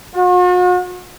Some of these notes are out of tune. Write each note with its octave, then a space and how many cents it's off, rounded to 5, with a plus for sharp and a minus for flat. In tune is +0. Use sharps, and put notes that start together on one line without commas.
F#4 -45